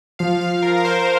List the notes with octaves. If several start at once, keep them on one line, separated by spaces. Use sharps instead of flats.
F3 F5
F5
F3 A#4
A#4
C5